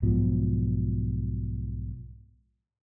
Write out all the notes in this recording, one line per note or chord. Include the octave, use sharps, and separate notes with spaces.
B1 G#2 B2 F3